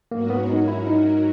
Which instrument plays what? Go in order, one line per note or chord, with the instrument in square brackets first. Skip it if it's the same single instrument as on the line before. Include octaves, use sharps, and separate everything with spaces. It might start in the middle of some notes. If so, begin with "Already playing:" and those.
[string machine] G#2 F#3 C#4 F#4 A#4 [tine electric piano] A#3
[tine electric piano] B3
D#4
E4
D#4